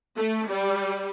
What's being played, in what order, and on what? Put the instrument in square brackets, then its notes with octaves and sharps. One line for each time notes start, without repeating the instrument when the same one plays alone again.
[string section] A3
G3